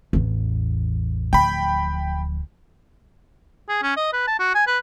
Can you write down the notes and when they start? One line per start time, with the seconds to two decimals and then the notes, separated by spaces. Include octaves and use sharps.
0.13 A1 E2
1.33 D1 F3 G5 B5
3.69 G#4
3.83 C#4
3.97 D#5
4.13 B4
4.27 A5
4.40 F#4
4.55 G#5
4.67 B4